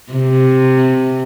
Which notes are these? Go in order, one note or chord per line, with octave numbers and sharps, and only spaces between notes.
C3